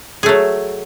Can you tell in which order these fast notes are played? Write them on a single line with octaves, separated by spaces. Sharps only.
G#4 A3 F#3